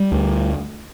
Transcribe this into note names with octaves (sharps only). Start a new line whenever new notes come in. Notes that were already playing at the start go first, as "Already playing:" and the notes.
Already playing: G3
D2